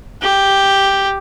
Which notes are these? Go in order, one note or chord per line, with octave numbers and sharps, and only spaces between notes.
G4